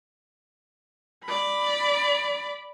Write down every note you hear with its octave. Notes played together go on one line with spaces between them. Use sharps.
D5 B5